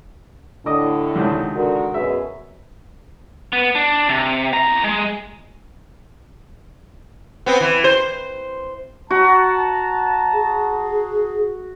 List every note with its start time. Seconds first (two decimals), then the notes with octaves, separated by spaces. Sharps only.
0.66 A2 D3 D#5 D6 D#6
1.16 C#2 C3 D#3
1.55 D3 F#4 A#4
1.94 F#2 B2 G#4 E5
3.53 B3
3.75 D4
4.09 C3
4.53 E2 A#5
4.84 G#3
7.46 B3 C4
7.61 E3
7.84 C5
9.11 F#4 A5 A#5
10.34 G#4